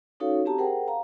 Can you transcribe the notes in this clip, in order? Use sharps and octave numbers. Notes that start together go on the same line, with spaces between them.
C#4 D#4 F#4 A4 C#5 F5
C4 G4 A5 A#5
G#4 A#4 C5 F#5 G5
F5 A#5